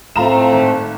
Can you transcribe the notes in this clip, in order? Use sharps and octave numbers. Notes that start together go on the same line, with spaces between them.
A2 A3 C4 F4 A#5 E7
G#1